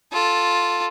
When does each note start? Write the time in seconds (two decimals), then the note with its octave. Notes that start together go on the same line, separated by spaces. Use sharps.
0.12 F4 A4